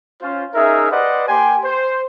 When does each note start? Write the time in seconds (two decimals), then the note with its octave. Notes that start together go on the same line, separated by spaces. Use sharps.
0.22 C#4 F4 C5
0.55 C#4 D#4 G#4 A#4 E5
0.91 G4 B4 C5 D5 D#5 F#5
1.28 A#3 G4 G5 G#5 C6
1.63 C5